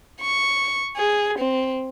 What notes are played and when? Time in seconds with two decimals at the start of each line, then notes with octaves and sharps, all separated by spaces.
0.21 C#6
0.97 G#4
1.39 C4